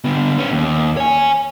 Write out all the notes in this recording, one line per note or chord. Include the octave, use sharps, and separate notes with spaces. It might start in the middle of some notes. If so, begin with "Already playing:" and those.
D3 B3
B3 C#4
D#2
C#5 G#5